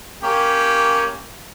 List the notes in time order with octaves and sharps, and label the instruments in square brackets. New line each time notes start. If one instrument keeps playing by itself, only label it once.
[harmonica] A#3 C#4 G4